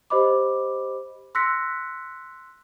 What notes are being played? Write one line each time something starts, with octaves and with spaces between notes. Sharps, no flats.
G4 C5 D#5 B5 D6
C6 E6 F#6 A#6 B6 C#7